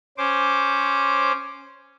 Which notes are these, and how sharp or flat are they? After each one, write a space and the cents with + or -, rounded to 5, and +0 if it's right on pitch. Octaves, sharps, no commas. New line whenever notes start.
C#4 +0 C5 +0 D6 +0